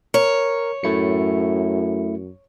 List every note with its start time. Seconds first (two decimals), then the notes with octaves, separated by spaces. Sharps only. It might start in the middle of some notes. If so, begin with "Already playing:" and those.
0.14 A#4 C#5
0.84 F#2 A3 E4 C#7